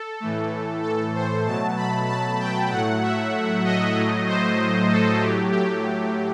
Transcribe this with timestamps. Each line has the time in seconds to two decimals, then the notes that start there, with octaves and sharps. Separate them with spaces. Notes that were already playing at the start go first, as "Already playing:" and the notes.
Already playing: A4
0.20 A2 E3 A3
0.83 A4
1.15 C5
1.46 B2 F#3 A3 A5
1.76 B5
2.08 A5
2.39 G5
2.71 A2 F#3 A3 F#5
3.03 E5
3.65 D#5
3.96 A2 F#3 A3
4.27 C5
4.90 A4
5.21 A2 F#3 A3 G4
5.52 G4